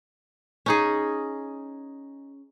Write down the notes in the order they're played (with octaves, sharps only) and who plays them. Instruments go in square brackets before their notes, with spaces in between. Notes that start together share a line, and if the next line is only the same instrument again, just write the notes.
[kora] C#4 D#4 G#4